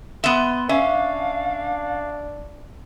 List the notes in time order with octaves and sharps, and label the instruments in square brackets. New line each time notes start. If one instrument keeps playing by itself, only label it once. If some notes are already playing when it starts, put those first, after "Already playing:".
[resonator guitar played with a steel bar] B3 E5 [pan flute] C6
[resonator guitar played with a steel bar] C#4 [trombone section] D4 [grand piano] E5 [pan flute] F5